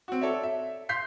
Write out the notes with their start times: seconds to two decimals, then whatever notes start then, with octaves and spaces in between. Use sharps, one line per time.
0.08 C4 F#4
0.21 A4 C#5 D5 E5
0.43 E5
0.89 F5 C6 G6 B6 C7